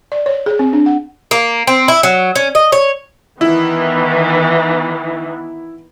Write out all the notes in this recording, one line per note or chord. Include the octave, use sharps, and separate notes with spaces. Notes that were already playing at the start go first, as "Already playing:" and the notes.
D5
C#5
G#4
C4
D4
F#5
A#3
C4
E4
F#3
C#4
D#5
C#5
D#3 E3 B3 E4